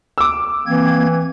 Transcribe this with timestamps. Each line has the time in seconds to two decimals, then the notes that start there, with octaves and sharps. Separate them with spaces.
0.18 D6 E6
0.67 E3 A#3 C4 G#6